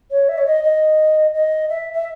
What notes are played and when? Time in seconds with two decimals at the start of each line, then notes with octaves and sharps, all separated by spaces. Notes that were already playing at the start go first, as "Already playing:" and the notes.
0.11 C#5
0.29 E5
0.38 C#5
0.47 D#5
0.64 D#5
1.34 D#5
1.69 E5
1.94 E5